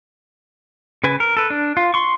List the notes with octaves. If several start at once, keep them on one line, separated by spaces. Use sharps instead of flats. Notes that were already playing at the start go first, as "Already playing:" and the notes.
C#3 B4 G#5
A#4
A4 B4
D4
F4
C6 C#6